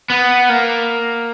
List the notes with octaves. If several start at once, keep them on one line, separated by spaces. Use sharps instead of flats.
B3
A#3